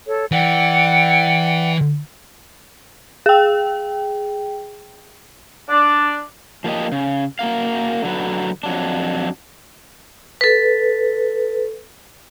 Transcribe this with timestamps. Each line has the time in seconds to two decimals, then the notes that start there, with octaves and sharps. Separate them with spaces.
0.07 A4 C#5
0.32 E3 D5 F#5 G5
3.26 G#4 G5
5.69 D4 D5
6.64 F3 A#3 G4 D#5
6.92 C#3
7.39 A#3 F#4 A#4 F5
8.03 D3 F#3 B4
8.63 F2 F#3 D4
10.41 A4 B4